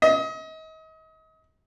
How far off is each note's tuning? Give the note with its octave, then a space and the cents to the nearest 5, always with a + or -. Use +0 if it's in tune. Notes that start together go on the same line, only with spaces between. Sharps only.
D#5 +35